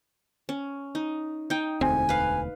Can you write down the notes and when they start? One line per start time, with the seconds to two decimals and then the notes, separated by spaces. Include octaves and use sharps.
0.49 C#4
0.95 D#4
1.50 D#4 G5
1.81 E1 D2 C4 G#5
2.09 B4 F5